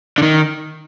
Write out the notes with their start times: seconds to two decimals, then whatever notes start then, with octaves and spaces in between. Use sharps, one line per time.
0.18 D3
0.23 D#3